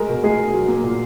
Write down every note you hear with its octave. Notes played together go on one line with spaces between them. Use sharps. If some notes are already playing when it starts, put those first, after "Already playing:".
Already playing: G#3 A#4
B2
G#3 G#4
B2
F#3
A#3
A#2